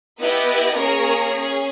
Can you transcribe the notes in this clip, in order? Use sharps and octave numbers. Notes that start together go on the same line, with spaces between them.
B3 E4 G4 B4 D#5
A#3 C#4 G#4 A#4 C#5
C#4 G#4